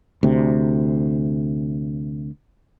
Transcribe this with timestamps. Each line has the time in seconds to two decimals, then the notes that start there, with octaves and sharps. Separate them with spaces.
0.23 D2 C3